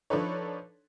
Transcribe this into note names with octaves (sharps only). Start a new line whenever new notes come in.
F3 D4 D#4 A4 B4 C#5